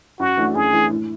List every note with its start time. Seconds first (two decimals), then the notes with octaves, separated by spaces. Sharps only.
0.19 F#2 F#4
0.37 E3 A3 D4
0.55 F#2 G#4
0.73 E3 A3 D4
0.91 A2